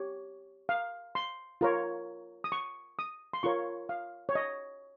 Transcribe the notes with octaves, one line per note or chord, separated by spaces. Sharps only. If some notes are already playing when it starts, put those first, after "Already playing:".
Already playing: G4 C#5
F5
C6
F4 A#4 C#5
D#6
C#6
D#6
C6
F4 A#4 C#5 C#6
F5
C#5
D#5